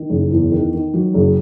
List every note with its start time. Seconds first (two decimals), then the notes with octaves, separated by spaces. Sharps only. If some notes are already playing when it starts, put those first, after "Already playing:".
Already playing: D#3
0.10 F#1
0.31 E2
0.51 D#3
0.73 D#3
0.94 F#3
1.14 F#1